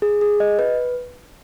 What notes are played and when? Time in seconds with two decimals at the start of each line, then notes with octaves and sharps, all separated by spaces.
0.02 G#4
0.21 G#4
0.40 D#5
0.59 B4